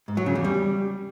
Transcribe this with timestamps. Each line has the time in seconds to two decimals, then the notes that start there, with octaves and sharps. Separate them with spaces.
0.08 G#2
0.17 F#3
0.26 C#3
0.35 E2
0.45 G3